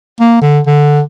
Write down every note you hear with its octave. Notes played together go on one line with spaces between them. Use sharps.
A#3
D3
D3